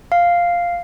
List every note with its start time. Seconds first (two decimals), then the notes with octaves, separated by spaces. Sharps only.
0.12 F5